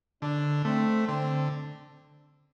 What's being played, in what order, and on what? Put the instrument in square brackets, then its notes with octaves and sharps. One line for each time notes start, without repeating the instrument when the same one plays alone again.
[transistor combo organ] D3 [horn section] D4
[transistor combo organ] A3 [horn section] C4
[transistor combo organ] D3 [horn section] C4